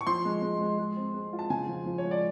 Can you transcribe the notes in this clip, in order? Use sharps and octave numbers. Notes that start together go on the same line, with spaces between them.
C#6
F3 C6
G#3
G#3
G#3
G#3
C4
G#3
F4
A5
C#3 G#5
F3
F3
C#5
G#3
D5